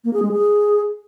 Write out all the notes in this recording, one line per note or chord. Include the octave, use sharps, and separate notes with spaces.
A#3
G#4
G#3
G#4